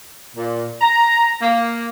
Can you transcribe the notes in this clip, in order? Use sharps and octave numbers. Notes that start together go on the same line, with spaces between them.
A#2
A#5
A#3